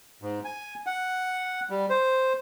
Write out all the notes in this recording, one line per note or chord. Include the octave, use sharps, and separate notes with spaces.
G#2
G#5
F#5
G3
C5